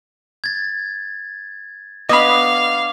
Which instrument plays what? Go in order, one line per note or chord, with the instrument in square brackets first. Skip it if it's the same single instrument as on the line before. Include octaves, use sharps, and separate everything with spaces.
[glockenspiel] G#6 A6
[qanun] B3 D4 [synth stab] D#5 B5 [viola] F5 [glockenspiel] D6